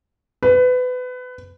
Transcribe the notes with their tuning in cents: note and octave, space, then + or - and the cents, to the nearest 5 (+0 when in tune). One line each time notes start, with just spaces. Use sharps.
B4 +25